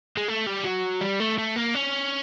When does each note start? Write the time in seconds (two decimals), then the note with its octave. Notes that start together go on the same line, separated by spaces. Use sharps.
0.17 G#3
0.28 A3
0.46 G3
0.64 F#3
1.01 G3
1.20 A3
1.38 A3
1.56 A#3
1.75 C#4